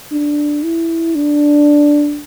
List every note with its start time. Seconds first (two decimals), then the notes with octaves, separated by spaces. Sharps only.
0.12 D4
0.63 E4
1.15 D4